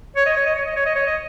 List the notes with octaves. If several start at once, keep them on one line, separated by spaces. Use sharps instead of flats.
C#5
D#5
C#5
D#5
C#5
D#5
C#5
D#5
C#5
D#5